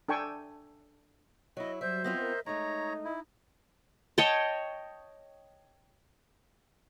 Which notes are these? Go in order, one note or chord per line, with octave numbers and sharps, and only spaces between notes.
D4 A4 G5 G#5 C#6
F#3 E4 D#5
F#3 G3 C5 E5
B3 C4 F4 D#5 E5
A#4
G#3 A3 D#4 C#5 D#5 A#5
E4
C#5 D#5 G5 A5